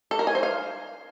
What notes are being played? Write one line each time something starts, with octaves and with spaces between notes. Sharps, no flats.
A4
A#4
G#5
C5
F5